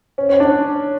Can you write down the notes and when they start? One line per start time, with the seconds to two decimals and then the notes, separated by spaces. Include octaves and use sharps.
0.18 C#4
0.29 C#4
0.40 D4